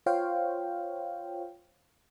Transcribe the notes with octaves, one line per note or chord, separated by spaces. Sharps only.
F4 C5 C#5 F5 G5